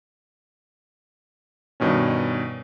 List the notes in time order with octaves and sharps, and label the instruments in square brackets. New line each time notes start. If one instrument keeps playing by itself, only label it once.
[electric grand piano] G2 B2 D#3 C#4